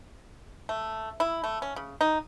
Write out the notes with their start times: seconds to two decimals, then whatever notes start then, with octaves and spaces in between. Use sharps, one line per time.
0.69 A3
1.20 E4
1.44 A3
1.62 C#4
1.76 C#3
2.01 D#4